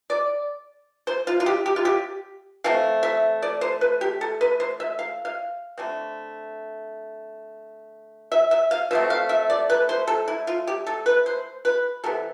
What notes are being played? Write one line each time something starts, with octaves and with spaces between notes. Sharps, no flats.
D5
C5
F4
F4
G4
G4
F4
G4
E3 A3 C4 F5
E5
D5
C5
B4
G4
A4
B4
C5
E5
F5
F5
D3 A3 C4
E5
E5
F5
B2 A3 C4 E5
F5
E5
D5
B4
C5
A4
E4
F4
G4
A4
B4
C5
B4
C3 E3 B3 A4